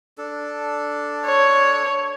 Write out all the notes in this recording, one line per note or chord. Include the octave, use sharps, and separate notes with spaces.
D4 A4
C#5